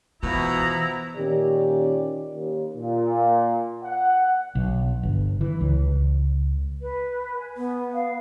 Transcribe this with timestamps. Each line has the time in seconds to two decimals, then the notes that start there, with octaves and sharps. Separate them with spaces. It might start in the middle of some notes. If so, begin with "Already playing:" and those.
0.23 B2 E3 F3 B3 E4 A#5
1.17 A#2 D#3 C#4 G4 D5
2.32 D#2
2.77 A#2
3.83 F#5
4.55 B1
5.03 G1
5.41 E3
5.61 C#2
6.82 B4
7.38 G#5
7.57 B3
7.94 F5